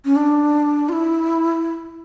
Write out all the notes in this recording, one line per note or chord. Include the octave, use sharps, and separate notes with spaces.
C#4
D4
F4
E4